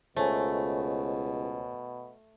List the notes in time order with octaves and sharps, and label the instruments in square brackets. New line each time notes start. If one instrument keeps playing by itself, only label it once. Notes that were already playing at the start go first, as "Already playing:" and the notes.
[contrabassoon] C#2 [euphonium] B2 [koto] A3 [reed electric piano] C5 C#5 G#5